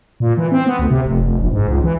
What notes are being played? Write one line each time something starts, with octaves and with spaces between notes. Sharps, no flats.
A#2
E3
C4
B3
D2
C3
F1
F1
A#1
G#2
C#2
E3